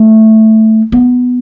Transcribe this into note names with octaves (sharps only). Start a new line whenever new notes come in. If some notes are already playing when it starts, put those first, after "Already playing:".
Already playing: A3
B3